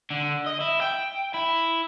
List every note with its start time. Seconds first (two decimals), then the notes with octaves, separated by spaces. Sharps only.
0.10 D3
0.46 D#5
0.60 E4
0.81 G5
1.34 E4